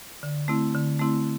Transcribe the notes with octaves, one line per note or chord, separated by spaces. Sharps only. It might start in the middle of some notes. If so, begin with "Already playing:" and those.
D3
A3 C4 E4
D3
A3 C4 E4